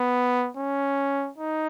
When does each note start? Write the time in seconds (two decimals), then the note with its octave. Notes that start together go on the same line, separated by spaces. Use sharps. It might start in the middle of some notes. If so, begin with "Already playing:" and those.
Already playing: B3
0.57 C#4
1.38 D#4